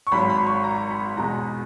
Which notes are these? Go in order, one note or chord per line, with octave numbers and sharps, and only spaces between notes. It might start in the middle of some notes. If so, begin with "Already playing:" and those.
C#6
G#1 G#2 F#3 B5
B5
C#6
A#5
B5
E2 B2 G#3 A#5